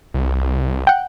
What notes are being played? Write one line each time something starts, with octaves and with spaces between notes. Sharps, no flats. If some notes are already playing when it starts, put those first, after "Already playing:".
C2
F#5 G5